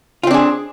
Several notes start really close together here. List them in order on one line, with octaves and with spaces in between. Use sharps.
F4 C4 D4 G#4